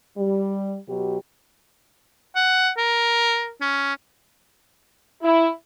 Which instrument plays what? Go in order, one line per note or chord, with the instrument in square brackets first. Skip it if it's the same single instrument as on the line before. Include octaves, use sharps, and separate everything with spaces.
[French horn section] G3
B2 F#3 G4
[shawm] F#5
A#4
C#4
[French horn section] E4